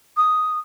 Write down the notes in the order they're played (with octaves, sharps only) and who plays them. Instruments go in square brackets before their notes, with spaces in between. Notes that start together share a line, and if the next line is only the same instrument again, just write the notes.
[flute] D#6